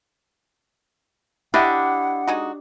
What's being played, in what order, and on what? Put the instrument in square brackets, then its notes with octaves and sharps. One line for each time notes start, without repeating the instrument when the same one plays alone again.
[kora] D4 G4 D#5 [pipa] E4 [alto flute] F#5
[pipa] G#3 D#4 F#4